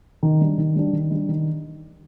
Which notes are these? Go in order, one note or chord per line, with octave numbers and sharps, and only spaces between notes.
D#3
G3 D4
D#3
G3 D4
D#3
G3 D4
D#3